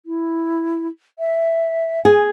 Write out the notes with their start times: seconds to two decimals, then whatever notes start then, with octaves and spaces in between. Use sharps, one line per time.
0.06 E4
1.19 E5
2.05 G#4 G#5